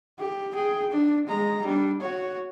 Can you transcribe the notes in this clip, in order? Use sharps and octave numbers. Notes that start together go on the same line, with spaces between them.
G4
G#4 G5
D4
G#3 A#5
G3 D4
F#4 C#5